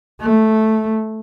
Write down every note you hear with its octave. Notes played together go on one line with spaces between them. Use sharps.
A3